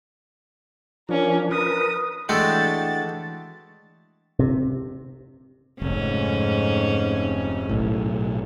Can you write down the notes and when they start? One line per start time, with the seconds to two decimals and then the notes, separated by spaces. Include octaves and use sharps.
1.09 F3 C#4 D4 A#4
1.51 A#4 B4 D#6
2.29 E3 G#3 A3 D4 F#4 G5 A6
4.39 C3
5.82 F1 G#2 C#4
7.69 B1 A2